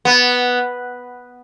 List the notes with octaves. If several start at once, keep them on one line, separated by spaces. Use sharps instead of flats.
B3